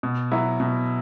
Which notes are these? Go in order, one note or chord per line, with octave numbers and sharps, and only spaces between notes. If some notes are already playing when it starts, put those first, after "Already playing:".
B2
F#3 B3 E4
B2